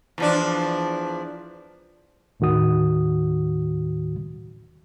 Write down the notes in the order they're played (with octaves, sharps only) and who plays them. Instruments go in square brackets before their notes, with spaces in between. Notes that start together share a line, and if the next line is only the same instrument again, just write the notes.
[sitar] E2 F3 D4
[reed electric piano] D#2 A2 D#3 F#4 D#6